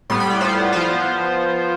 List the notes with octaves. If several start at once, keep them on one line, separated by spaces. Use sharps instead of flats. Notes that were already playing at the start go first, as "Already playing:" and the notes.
A2 G3 B3 C6
B5
D5
A2 G3 B3 F4 C5
F3 B3 F4 C5